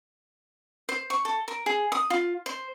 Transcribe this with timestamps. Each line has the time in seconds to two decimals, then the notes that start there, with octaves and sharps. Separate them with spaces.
0.89 C5
1.10 C#6
1.25 A4
1.48 A#4
1.66 G#4
1.92 D#6
2.10 F4
2.46 C5